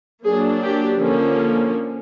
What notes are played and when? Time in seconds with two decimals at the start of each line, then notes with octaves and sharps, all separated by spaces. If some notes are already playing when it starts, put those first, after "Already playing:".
0.25 F#3 A#3 D4 G#4
0.62 G4
0.98 D3 F3 A#3 C#4